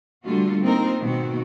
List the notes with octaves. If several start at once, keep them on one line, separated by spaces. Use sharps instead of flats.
D3 G3 A3 A#3 F4 F#4
A#3 C4 D#4 F4 A#4 C5
G#2 B2 D#3 A#3 C4 F#4